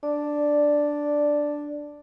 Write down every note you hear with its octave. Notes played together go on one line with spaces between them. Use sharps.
D4 D5